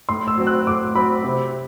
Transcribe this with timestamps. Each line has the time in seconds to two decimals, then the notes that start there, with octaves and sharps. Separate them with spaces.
0.09 A2 C6
0.28 E6
0.38 F#3 C4
0.47 F#6
0.67 A2 D6
0.95 F#3 C4 B5
1.24 C3